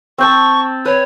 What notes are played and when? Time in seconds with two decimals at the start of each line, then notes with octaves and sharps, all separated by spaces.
0.18 C4 G5 A5 C#6
0.85 B4 C#5